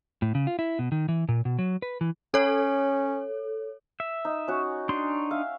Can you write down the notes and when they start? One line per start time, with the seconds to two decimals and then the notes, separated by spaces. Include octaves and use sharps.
0.22 A2
0.35 C#3
0.47 F4
0.59 E4
0.79 B2
0.92 D#3
1.08 E3
1.29 A#2
1.45 B2
1.59 F#3
1.82 B4
2.01 E3
2.34 C#4 A4 C#5
4.00 E5
4.25 D#4
4.48 C#4 F#4
4.89 D4 D#4 C6
5.31 E5 F5